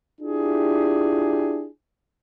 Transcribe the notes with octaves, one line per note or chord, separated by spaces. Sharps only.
D4 E4 F4 G4 G#4